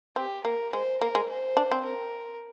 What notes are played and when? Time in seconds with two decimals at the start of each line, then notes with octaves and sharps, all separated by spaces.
0.16 C4 G4
0.44 A#3 A#4
0.73 G#3 C5
1.01 A#3 A#4
1.15 G#3
1.29 C5
1.57 D4
1.71 C4
1.85 A#4